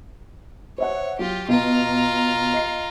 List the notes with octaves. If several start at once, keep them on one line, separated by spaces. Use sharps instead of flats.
C5 C#5 E5 F#5
F#3 F4 G4
B2 F4 A#5
D#5 C7